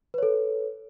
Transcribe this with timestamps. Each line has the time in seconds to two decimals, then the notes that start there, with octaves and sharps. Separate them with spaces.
0.14 B4
0.18 C#5
0.23 A4